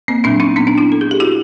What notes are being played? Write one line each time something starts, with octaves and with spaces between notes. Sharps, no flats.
A#3 C4
A#2 F#3 C4 D4
C#4 D#4
B3 C#4
C4 D4
D4 E4
A4
G#4
G4
E4 F#4